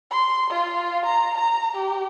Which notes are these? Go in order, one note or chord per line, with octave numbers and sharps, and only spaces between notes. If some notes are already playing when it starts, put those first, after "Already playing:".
C6
F4
A#5
A#5
G4